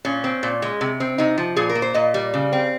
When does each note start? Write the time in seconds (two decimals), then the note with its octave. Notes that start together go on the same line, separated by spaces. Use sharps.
0.05 A#2 C#4
0.24 C4
0.43 A#2
0.62 G#3
0.81 C3
1.00 C4
1.18 C3 D#4
1.38 F3
1.56 A#2 G#4
1.69 A#4
1.75 A#3
1.82 C5
1.94 A#2 D#5
2.14 G3
2.34 C#3
2.53 C4